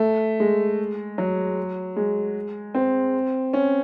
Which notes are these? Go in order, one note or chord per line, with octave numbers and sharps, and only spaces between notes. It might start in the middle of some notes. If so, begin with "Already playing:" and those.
Already playing: A3
G#3
F#3
G#3
C4
C#4